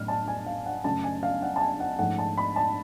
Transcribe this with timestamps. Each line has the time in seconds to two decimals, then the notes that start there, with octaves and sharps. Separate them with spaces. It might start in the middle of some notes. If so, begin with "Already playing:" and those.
Already playing: A2 F#3 C#4 F6
0.08 A5
0.28 G#5
0.46 F5
0.66 F#5
0.84 F#2 C#3 F#3 A3 C#4 A5
1.04 G#5
1.23 F5
1.42 F#5
1.56 A5
1.61 G#5
1.80 F#5
1.98 G#2 F3 A3 C#4 F#5
2.18 A5
2.38 B5
2.56 A5